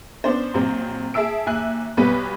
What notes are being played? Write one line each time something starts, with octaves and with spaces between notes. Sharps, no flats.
B3 C#4 D4 C5
A#1 F#3 C4
G#4 E5 A5 E6 D7
D#2 E5 G#5 F#6
B1 G3 B3 B4